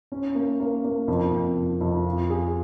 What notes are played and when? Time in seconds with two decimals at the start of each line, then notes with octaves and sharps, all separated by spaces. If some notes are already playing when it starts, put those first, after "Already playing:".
0.12 C#4
0.35 A#3
0.60 A#3
0.84 A#3
1.08 F2
1.32 F2
1.56 F2
1.81 F2
2.05 F4
2.30 G#4